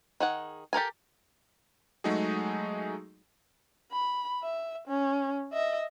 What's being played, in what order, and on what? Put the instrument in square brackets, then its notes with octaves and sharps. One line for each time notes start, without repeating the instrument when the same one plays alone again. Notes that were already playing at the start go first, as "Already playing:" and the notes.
[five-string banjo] D#3 G#4 F#5
G4 A4 A#4 G#5
[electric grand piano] F#3 G#3 A3 D#4 F#4 G#4
[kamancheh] B5
E5
C#4
D#5 E5